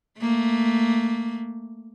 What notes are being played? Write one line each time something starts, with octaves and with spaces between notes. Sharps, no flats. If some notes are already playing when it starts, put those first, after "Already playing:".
A3 A#3